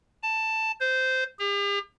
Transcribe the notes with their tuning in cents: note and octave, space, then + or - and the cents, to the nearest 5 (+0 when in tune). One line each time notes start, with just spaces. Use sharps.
A5 +10
C5 -15
G4 +45